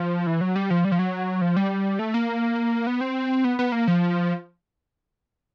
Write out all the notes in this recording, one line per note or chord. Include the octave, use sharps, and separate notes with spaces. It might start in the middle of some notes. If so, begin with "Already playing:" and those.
Already playing: F3
E3
F#3
G3
F3
G3
F3
F#3
F3
G3
A3
A#3
B3
C4
B3
B3
A#3
F3